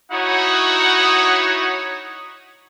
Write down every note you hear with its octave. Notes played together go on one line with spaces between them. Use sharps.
D#4 E4 F#4 C#5 F#5 D#6